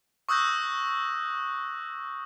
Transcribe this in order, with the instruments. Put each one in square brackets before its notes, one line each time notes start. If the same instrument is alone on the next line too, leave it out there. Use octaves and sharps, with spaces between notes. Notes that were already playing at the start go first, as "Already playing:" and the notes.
[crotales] C#6 D#6 E6 F#6 G6 A#6